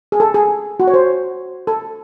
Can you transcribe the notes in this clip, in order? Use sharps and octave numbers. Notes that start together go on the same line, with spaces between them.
G#4
A4
G#4
F#4
C#5
C5
A4